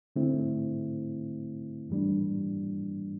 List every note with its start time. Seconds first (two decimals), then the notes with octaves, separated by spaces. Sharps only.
0.16 D3 A3 C4 E4
1.90 G2 E3 G3 A#3 D4